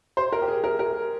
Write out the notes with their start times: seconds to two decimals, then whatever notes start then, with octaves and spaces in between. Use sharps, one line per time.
0.17 C5
0.32 A#4
0.42 G4
0.48 G#4
0.64 A#4
0.79 A#4